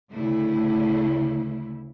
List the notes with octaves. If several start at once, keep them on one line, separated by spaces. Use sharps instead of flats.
D2 C#3 A3 E4